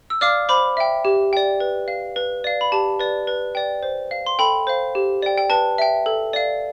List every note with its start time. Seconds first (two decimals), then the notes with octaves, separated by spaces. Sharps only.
0.10 E6
0.21 D5 F5 D6 F6
0.49 C5 B5 D6
0.77 E5 G5
1.05 G4
1.33 D5 G5
1.60 B4
1.88 F5
2.16 B4
2.44 D5 F5
2.61 B5
2.72 G4 A5
3.00 B4 D5
3.27 B4
3.55 D5 G5
3.83 C5
4.11 F5
4.26 C6
4.39 A4 G5 B5
4.67 C5 F5
4.95 G4
5.22 D5 G5
5.38 G5
5.50 B4 A5
5.78 E5 G5
6.06 A4
6.33 D5 F5